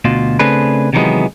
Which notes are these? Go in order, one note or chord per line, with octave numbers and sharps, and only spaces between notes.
D2 B2 F4
C#3 A3 C4 D4 G#4 B4
C3 D#3 E3 F#3 G#3 B3